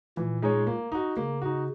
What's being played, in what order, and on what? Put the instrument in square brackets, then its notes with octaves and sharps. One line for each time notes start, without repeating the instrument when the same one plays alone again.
[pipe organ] A#2 [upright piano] E3
[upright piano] G#3 D#4 G#4 C#5
A#3
D#4 F#4
[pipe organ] C#3 [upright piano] A#3
[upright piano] D#4 F#4